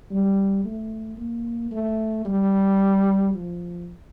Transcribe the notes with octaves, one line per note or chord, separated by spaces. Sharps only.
G3
A3
A#3
A3
G3
F3